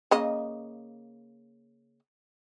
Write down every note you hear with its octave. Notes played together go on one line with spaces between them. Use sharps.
C#3 A#3 D#5